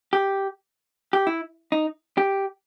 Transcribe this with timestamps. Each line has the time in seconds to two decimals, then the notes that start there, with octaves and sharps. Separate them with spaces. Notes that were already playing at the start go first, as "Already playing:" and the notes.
0.13 G4
1.13 G4
1.27 E4
1.72 D#4
2.18 G4